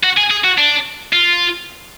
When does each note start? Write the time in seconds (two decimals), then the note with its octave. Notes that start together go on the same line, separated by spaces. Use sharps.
0.04 F#4
0.17 G#4
0.31 G#4
0.44 F#4
0.58 D4
1.13 F4